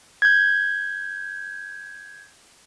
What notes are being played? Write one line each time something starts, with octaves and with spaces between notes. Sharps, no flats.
G6 G#6